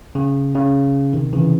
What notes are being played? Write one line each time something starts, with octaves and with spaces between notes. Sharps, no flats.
C#3
C#3
C3 D#3
C#3 E3